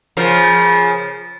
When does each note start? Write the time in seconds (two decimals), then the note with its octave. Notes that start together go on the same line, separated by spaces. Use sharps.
0.17 C#3 F3 A#4